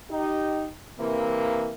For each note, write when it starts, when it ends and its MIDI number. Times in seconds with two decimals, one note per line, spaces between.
0.11 0.67 63
0.11 0.67 67
0.99 1.72 48
0.99 1.72 52
0.99 1.72 58